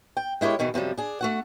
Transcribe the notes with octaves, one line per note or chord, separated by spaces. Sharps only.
G5
G#3 E4 G4 A#4 C#5
E2 B2 D#3 E3
F#2 C3 F3 G3
D4 G#4
A3 F#4 F#5